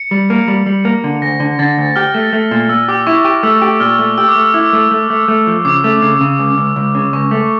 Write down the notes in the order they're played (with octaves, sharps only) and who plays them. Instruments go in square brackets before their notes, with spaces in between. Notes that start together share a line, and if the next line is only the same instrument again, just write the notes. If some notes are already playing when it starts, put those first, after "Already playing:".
Already playing: [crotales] C#7
[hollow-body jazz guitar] G3
A#3
G3
G3
A#3
D3
[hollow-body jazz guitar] D2 [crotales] A#6
[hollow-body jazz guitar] D3
[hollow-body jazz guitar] D3 [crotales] A6
[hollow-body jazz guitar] D2
[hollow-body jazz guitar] G4 [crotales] F6
[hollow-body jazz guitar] A3
A3
A#2
[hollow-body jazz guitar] A#2 [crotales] E6
[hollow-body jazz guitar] G4 [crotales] D6
[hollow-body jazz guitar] E4 [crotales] C#6
[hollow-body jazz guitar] G4 [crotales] C#6
[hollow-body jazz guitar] A3 [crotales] E6
[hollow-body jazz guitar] G4
[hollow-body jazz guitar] A#2 [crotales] F6
[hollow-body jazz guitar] A3
[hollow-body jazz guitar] G4 [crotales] E6
[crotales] D6
[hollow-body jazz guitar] A3 [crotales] E6
[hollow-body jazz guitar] E4
A3
A3
A3
A3
F3
[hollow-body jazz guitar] C#3 [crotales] D6
[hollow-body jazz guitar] A3
C#3
C#3
C#2
C#2
C#2
C#3
[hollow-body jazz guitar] C#2 [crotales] C#6
[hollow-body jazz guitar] A3